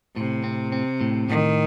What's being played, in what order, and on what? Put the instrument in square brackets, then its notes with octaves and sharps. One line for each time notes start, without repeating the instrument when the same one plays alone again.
[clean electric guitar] A2 [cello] C3
[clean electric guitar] C4
C4
A2
[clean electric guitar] A2 [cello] D#3